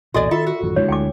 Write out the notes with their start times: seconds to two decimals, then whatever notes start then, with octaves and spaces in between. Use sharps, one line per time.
0.14 B1 E2 A#2 F#4 A4 D5 D#5 G#5
0.31 D#3 F4 A4 E5
0.47 F#4
0.62 A1 F#2 D#3
0.76 D3 G#3 E4 C#5
0.89 D2 G5 G#5 D6